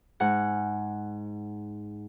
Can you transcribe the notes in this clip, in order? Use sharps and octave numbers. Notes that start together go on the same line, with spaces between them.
G#2 F#5